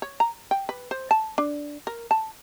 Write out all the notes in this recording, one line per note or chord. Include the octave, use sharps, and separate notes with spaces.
C#5
A#5
G5
B4
C5
A5
D4
A#4
A5